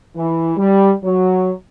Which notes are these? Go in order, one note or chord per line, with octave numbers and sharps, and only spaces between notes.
E3
G3
F#3